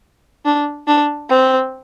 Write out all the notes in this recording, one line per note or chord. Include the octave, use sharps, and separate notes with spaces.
D4
D4
C4